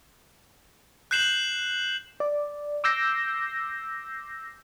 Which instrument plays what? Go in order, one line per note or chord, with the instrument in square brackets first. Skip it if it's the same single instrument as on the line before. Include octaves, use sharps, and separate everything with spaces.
[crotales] F#6 G6 C7 E7 F#7
[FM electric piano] D5
D6 E6 G6 A#6 C7